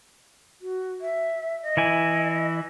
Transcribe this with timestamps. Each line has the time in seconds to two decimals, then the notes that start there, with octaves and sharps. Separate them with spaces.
0.61 F#4
1.01 E5
1.62 D#5
1.77 E3 E4 G#5